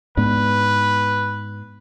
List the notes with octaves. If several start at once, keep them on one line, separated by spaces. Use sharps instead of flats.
G#2 B3 D4 B4